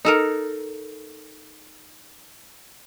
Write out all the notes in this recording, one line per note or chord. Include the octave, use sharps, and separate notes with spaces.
D#4 A4 A#4